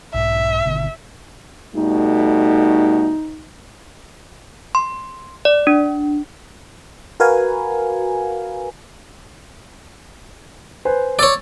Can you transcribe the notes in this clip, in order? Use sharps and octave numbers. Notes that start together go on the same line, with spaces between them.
B1 G#2 E5
G#1 B2 D3
B2 G3 A3 D#4
C6
D5
D4
F#4 A#4 B4 F5 G#5
B4 C5 G#5
C#5 D5 E6 A6